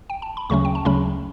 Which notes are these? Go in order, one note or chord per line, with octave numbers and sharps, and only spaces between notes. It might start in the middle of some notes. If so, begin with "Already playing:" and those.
G5
A5
B5
D2 C#3 F#3 A3 C#4 C#6
G5
A5
D2 C#3 F#3 A3 C#4 B5